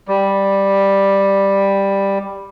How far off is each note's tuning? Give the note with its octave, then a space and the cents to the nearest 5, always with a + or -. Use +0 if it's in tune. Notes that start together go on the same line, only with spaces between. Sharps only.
G3 +5